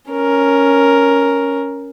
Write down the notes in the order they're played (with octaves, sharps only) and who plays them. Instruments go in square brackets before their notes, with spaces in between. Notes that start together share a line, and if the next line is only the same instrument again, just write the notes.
[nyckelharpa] C#4 A#4